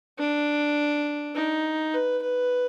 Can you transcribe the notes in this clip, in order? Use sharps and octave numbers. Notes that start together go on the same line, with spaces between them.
D4
D#4
B4
B4